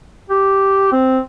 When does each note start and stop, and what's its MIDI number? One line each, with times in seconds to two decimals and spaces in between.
0.30 0.91 67
0.92 1.19 60